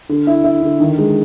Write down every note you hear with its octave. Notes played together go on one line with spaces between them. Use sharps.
D3
E4
E4
D3
D#3
G#3